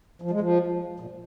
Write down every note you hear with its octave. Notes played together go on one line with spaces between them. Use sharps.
F3
G#3
F3
A#2